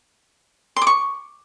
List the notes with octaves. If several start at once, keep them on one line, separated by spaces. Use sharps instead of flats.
C6
D6
C#6